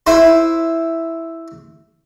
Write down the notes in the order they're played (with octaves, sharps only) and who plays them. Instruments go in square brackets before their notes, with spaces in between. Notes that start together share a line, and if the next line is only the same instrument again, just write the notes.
[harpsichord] E4 B4 C5